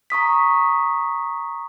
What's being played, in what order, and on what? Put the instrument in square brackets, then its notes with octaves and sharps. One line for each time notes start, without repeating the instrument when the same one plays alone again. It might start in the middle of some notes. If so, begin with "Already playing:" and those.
[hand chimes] A#5 C#6 D#6 B6